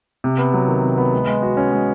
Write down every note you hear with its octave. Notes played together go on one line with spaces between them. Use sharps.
C3
B3
F#3
D#3
C3
B3
G#3
G#3
F#4
C#4
G#3